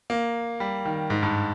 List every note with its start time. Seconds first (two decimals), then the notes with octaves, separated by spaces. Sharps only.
0.10 A#3
0.60 G3
0.85 D#3
1.10 G#2
1.23 G2